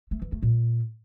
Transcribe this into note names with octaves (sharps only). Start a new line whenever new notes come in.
A3
E3
A3
A#2